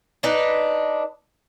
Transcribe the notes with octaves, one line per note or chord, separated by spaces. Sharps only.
D4 D#4 B4